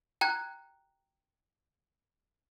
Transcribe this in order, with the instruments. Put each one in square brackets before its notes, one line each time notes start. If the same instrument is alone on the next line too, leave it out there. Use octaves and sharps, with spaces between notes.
[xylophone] G5 A#5 F#6 G#6